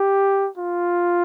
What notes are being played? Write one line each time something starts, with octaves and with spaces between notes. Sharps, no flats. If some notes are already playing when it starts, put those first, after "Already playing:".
Already playing: G4
F4